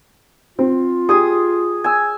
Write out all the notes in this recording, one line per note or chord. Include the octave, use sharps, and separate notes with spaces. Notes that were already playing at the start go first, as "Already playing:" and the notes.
C4 F4
G4 G#4 G#5 D#6
G#5 E6